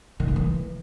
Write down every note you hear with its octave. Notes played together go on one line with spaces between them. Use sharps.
D#3
A#3
E3